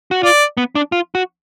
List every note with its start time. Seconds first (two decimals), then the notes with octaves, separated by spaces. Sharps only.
0.11 F#4
0.23 F4 D5
0.57 B3
0.75 D4
0.92 F4
1.15 F#4